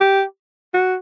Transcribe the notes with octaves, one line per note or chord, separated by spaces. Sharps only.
G4
F#4